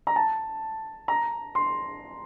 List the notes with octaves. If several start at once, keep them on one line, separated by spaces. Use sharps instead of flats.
A#5
A5
A#5
C6